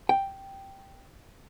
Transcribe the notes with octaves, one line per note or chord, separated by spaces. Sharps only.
G5